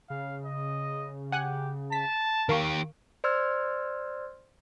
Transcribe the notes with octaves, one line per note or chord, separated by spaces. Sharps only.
C#3 F5
D#5
G4 F#5 G#5 F#6
A5 B6
D#3 G4 A#4 F5 C#6
C5 D5 C6 E6 F6 G#6